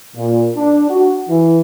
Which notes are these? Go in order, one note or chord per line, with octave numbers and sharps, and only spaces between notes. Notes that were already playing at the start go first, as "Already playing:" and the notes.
A#2
D4
F#4
E3